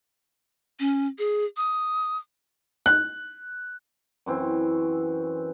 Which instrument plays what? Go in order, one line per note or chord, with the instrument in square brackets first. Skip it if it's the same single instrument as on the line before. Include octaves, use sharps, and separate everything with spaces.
[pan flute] C#4
G#4
D#6
[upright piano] F#6
[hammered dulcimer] F#2 E3 C4